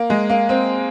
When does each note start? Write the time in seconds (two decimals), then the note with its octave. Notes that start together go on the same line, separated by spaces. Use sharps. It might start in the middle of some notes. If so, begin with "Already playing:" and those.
Already playing: A#3
0.10 G#3
0.29 A#3
0.49 C4